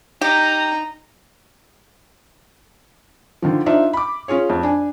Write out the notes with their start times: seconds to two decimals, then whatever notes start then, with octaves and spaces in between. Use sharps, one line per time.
0.21 D#4 G4 A#5
3.42 D3 D#3 F3
3.66 D4 D#4 F4 C5 E5
3.93 B5 D6
4.28 C#4 F4 G#4 C#5
4.50 F2
4.63 D4 G#5